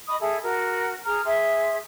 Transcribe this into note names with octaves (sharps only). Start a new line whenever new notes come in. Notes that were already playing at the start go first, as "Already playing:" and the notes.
D#5 B5 C#6 D#6
G#4 A4 E5
F#4 A#4
G#4 A#5 F6
G#4 E5 C6